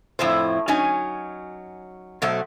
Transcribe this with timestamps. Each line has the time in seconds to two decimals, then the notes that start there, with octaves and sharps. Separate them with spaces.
0.19 F2 A2 E4 C5
0.68 F#3 C#4 D#4 G#5
2.22 B2 F#3 A3 C5 F#5